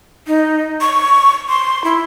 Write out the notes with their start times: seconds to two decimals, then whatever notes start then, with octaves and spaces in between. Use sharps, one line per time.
0.27 D#4
0.81 C#6
1.49 C6
1.84 E4